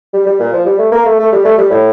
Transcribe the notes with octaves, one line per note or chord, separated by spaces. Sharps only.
G3
G3
A#2
F3
G3
A3
A#3
A3
A3
G3
A3
G3
A2